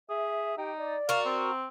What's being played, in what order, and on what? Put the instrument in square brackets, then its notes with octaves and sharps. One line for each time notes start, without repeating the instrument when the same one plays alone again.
[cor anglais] G#4 [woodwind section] E5
[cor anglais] D#4 [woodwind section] G4 G5
[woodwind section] D5
[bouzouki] F#4 A#4 [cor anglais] F5
[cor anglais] C4